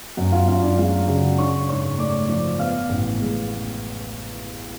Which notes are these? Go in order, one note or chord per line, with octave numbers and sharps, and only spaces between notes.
F#2 F#4 F#5
F4 F5
F#2 F4 F5
D4 D5
G#3 F4 F5
C#3 F#4 F#5
D4 C#5 C#6
G#2 C#5 C#6
A3 D5 D6
F3 D5 D6
B3 F5 F6
A1
G#3